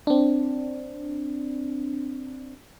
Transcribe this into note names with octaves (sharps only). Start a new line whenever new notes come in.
C4 D4